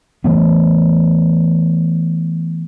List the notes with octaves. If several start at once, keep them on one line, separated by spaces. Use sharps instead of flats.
E3 A3 B3